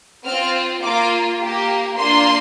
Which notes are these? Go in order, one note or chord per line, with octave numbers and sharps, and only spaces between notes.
C4 F4 F6
A#3 F4 D6
A#3 G4
A#3 D4 F4 C6